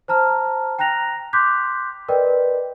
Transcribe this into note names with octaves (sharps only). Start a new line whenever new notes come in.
C5 A5 A#5 F6
G5 A#5 F#6 A#6 F7
C6 D6 F#6 G6 B6
A#4 B4 D5 D#5 G5